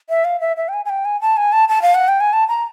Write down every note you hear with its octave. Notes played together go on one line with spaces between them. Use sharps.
E5
F5
E5
E5
G5
G#5
G#5
G5
G#5
A5
G#5
A5
A5
F5
F#5
G5
G#5
A5
A#5